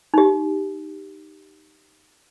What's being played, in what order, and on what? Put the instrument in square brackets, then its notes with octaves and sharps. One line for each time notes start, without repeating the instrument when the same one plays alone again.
[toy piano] D#4 G4